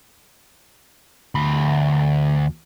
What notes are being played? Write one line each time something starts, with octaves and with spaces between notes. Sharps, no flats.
D2 B5